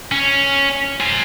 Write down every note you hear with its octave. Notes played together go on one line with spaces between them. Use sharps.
C#4
C5 G#5